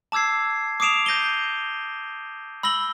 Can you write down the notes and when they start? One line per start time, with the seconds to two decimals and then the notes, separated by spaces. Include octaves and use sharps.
0.12 A5 D6 E6 G#6 C7
0.80 D6 D#6 C7 D7 E7 F7
1.06 G6 A#6 D#7 G7
2.63 B5 E6 A#6 F#7 G7